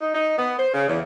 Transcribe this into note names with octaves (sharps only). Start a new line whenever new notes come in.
D#4
D#4
B3
C5
C#3
E2